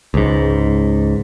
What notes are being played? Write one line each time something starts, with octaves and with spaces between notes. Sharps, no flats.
C#2 G#2